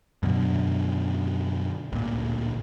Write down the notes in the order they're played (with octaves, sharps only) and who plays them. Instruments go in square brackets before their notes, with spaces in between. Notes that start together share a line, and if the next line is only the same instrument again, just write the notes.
[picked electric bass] F#2 B2 D3
A1 D2 A#2